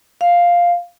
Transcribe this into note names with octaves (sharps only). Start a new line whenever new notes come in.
F5